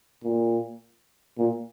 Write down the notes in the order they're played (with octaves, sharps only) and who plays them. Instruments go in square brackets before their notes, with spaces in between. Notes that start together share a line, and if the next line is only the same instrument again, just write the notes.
[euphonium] A#2
A#2